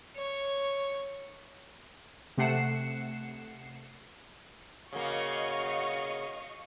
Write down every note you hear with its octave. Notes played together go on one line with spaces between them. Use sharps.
C#5
C3 A3 F#5 C7 C#7 E7
C#3 A#3 F#4 D#5 F5 C#6